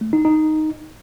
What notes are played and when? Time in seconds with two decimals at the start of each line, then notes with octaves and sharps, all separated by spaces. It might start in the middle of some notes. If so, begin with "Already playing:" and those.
0.01 A3
0.13 D#4
0.25 D#4